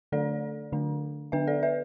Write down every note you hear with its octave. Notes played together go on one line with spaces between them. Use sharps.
D3 A3 D4 A4 D5
D3 A3 D4
D3 B3 D4 B4 E5
A4 D5
B4 E5